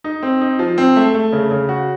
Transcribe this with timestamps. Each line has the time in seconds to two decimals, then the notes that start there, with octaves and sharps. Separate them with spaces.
0.04 D#4
0.22 C4
0.41 D#4
0.59 F3
0.78 C4
0.96 A3
1.14 A3
1.33 C#3
1.51 C#3
1.69 F#4